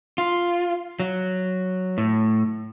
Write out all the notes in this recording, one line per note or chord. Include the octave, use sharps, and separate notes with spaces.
F4
F#3
A2